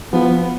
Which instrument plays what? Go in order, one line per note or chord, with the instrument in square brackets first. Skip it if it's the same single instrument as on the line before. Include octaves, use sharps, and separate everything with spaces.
[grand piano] F3 [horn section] B3